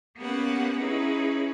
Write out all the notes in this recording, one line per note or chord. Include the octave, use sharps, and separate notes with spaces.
A#3 B3 C#4 G4 B4 F#5
C#4 D#4 E4 G#4 B4